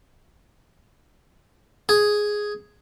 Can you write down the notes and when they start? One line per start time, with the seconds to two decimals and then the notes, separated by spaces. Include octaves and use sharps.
1.89 G#4